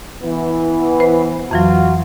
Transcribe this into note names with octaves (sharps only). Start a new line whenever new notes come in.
E3 B3
B4 C5
F2 E3 F#3 F4 F#4